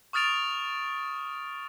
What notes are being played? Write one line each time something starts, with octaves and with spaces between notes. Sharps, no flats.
C#6 D#6 F6 A6 D7 F7